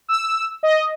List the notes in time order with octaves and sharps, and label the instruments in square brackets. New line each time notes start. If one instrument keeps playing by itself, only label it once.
[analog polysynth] E6
D#5